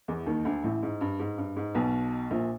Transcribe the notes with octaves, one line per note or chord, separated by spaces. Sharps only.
E2 E3
D#2 D#3
D2 D3
A1 A2
G#2
G2
G#2
G2
G#2
B1 B2
A#1 A#2